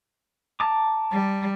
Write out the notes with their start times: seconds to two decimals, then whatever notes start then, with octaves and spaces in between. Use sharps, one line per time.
0.60 A5 A#5 D6
1.13 G3